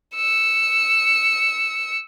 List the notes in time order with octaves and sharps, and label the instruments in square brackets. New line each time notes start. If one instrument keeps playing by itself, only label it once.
[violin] E6 C#7